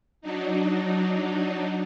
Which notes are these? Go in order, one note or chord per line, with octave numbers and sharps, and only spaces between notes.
F#3 D4 D#4